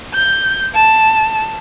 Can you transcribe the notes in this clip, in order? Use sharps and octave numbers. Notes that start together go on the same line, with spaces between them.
G6
A5